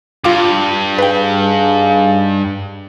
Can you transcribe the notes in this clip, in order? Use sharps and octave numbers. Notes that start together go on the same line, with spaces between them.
G2 F4 F5 D6
D#4 G#4 B4 F5 G5